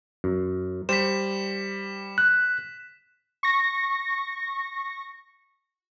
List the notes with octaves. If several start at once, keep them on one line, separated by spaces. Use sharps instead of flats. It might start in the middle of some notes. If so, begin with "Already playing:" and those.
F#2
G3 C5 B6 E7
F#6
C#6 A#6